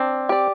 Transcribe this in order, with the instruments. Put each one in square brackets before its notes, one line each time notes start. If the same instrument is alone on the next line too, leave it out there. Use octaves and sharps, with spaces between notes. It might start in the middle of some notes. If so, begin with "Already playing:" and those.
Already playing: [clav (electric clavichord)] C4 [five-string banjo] D4
[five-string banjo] G4 D5